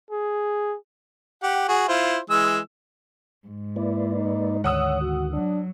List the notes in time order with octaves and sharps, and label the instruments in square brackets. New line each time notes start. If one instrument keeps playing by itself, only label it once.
[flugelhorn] G#4
[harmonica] G4 F#5
F#4 G#4
E4 F4 C5
E3 G#3 E6
[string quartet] G#2
[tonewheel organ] A#3 B4 D5 [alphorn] E4
[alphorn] D#4
[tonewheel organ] D2 D3 D#3 [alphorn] C#5 [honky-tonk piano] F#5 D#6 E6
[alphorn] F#4
[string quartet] F#3 [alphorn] D4